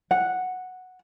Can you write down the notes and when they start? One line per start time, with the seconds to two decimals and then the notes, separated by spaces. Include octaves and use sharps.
0.11 F#5